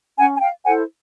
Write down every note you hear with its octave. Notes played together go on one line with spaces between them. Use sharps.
C#4 F#5 G#5
G#5
F5 G5
E4 A4 C5 F#5 G#5